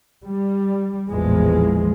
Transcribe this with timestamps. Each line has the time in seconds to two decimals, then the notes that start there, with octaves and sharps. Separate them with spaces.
0.23 G3
1.10 A1 E2 A#2 E3 F3 G#3